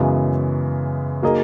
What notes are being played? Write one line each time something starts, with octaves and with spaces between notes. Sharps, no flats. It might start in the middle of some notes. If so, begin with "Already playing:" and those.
Already playing: F#2 C#3 E3 G#3 B3
F#3 A#3 D#4 G#4 D#5